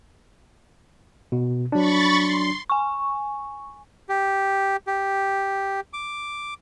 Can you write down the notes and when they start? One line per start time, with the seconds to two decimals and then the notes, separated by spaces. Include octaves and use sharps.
1.32 B2
1.72 F#3 D4 B5 C#6 A6
2.13 C6
2.70 G#5 C#6
4.09 G4
4.87 G4
5.93 D6